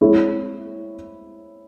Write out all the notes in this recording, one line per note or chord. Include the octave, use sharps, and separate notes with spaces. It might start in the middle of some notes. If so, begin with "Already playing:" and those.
G#3 C4 E4 G#4 C#5